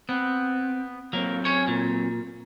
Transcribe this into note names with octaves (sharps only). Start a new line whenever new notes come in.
B3 C4
F#3 A#3 C4
C#4 C#5
A#2